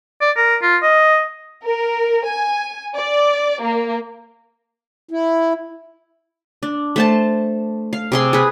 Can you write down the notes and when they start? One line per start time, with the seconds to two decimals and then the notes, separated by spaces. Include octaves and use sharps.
0.21 D5
0.37 A#4
0.62 F4
0.82 D#5
1.62 A#4
2.24 G#5
2.94 D5
3.62 A#3
5.11 E4
6.63 D4
6.96 A3 C5 A5
7.93 F5
8.12 C3 G#4 C6
8.33 G#4 B4